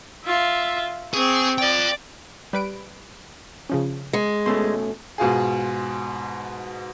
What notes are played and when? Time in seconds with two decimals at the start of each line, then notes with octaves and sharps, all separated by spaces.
0.24 F4 E5
1.14 C4 G#4 C#6
1.58 F4 D5 G5
2.53 G3 B4 D7
3.70 C#3 F3 C#4
4.13 G#3
4.46 B2 A3 C#4 C6
5.18 G#2 B2 F4 G#4